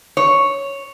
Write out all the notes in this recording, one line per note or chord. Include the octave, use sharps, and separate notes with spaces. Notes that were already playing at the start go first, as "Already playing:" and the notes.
C#5